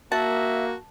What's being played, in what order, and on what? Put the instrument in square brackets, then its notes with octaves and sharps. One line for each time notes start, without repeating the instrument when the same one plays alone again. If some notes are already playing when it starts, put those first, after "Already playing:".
[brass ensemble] A#3 [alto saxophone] F#4 [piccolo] E5 [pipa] A5